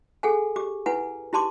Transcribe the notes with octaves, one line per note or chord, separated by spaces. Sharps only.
G#4 A4 F#5 G#5
G4 D6
E4 B4 F#5 G#5
E4 G4 A5 C6 D6